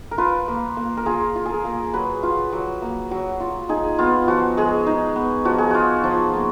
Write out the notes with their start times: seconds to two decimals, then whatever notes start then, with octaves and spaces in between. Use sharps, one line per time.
0.11 A#4
0.18 F4 B4
0.48 A#3
0.77 A#3
0.97 A#4
1.06 F4 G#4
1.36 F4
1.45 G#4 A#4
1.65 A#3
1.94 F#3 B4
2.23 F4
2.52 F#3
2.82 A#3
3.11 F#3
3.40 F4
3.69 D#4 G#4
3.99 B3 F4
4.28 F3 F#4
4.57 G#3 G#4
4.86 D#4
5.16 B3
5.45 F3 F#4
5.58 G#4
5.71 F4 F#4
6.04 F3
6.34 A#3